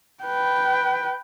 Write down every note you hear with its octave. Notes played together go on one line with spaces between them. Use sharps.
B4 G5